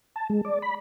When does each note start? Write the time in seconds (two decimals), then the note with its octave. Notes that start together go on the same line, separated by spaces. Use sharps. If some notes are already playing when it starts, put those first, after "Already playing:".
0.16 A5
0.30 G#3
0.45 D5
0.62 B5